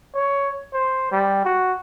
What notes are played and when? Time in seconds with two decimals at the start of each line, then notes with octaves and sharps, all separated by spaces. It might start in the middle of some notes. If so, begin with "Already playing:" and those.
0.15 C#5
0.74 C5
1.12 G3
1.45 F#4